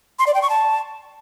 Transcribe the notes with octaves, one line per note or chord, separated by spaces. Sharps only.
C6
D5
G5
C#6
A5